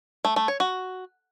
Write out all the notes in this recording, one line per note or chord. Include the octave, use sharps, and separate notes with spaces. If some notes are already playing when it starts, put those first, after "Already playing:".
A3
A3
C#5
F#4